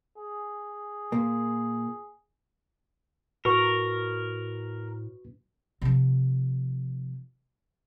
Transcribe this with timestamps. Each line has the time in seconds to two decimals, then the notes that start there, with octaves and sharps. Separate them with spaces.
0.18 G#4
1.12 A#2 A#3
3.45 A2 F#4 A#4 B4 C#6
5.81 C3 F3